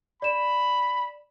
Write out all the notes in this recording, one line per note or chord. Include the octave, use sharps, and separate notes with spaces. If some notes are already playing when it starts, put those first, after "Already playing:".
D5 B5 E7